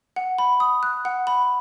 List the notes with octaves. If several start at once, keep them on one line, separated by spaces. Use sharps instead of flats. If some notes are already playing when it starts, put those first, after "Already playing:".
F#5
B5
D#6
F#6
F#5
B5